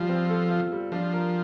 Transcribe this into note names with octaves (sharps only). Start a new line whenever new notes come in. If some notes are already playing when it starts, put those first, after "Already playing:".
Already playing: F3 G3 F4
C4
A4
F4
G3
F3 D4
A#4